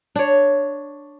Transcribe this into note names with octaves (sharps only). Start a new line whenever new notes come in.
D4 C#5